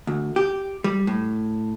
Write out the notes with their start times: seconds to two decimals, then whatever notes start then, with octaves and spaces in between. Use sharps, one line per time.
0.07 D2
0.36 G4
0.84 G3
1.07 A2